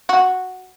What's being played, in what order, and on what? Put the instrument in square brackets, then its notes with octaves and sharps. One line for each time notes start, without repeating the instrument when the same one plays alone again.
[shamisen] F#4